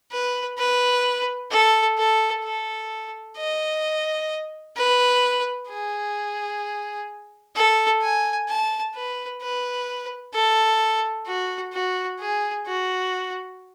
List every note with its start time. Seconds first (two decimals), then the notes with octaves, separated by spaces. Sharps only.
0.12 B4
0.58 B4
1.51 A4
1.98 A4
2.44 A4
3.37 D#5
4.77 B4
5.69 G#4
7.56 A4
8.02 G#5
8.48 A5
8.95 B4
9.42 B4
10.34 A4
11.26 F#4
11.73 F#4
12.20 G#4
12.67 F#4